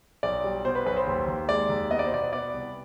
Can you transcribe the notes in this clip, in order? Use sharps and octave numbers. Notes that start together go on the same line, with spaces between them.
B1 D5
G3
B2 C5
B4
B1 B4
C5
D#2
D#2
G#3 D5
D#2
B3 D#5
D5
C5
B2 D5
B3 D5
C2